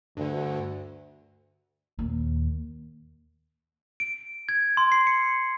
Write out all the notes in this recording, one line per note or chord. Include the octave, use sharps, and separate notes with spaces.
D2 G2 D3
D#2 A#2
D7
G#6
C6
C7
C#7